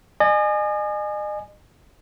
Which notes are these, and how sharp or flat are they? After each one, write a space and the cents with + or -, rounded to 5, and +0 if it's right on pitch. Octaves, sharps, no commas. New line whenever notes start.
D#5 -40 G#5 +5